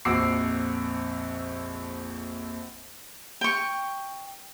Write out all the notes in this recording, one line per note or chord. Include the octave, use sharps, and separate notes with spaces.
A#1 F2 F#4 D6 E6 C7
G5 C#6